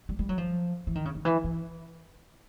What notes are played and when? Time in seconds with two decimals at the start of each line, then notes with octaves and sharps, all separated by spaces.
0.09 G3
0.19 G3
0.29 F#3
0.38 F3
0.87 E3
0.95 D#3
1.05 C#3
1.15 D3
1.25 E3
1.44 E3